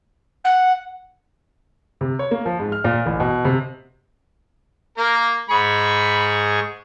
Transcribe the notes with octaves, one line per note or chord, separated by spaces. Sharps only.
F#5
C3
C#5
A#3
F3
G#2
F6
A#2
A1
B2
C3
A#3 A#4
G#2 G#4 B5 C#6